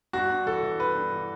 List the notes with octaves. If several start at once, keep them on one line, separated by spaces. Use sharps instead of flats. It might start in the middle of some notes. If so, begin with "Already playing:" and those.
G2 F#4
G2
E3 A4
E3
G2 B4
G2
E3